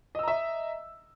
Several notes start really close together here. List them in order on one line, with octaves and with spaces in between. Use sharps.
D#5 E6 A#5 E5